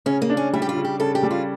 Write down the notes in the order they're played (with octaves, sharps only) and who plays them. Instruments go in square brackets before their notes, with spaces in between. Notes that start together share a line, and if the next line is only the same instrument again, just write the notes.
[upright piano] C#3 [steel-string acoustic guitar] C#4
[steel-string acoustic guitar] A#3
[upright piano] D4
[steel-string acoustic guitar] C#4
[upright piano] G3 [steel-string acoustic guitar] E4
[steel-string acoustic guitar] G4
F4
[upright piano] C#3
[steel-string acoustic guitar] G4
[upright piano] C#3 [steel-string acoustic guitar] A4
[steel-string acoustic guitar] G4
[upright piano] G3
[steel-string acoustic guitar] F4